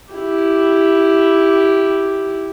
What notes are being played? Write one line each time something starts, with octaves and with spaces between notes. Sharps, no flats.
E4 G4